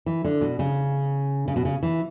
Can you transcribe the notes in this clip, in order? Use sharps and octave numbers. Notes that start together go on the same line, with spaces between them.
E3
D3
B2
C#3
C#3
B2
C#3
E3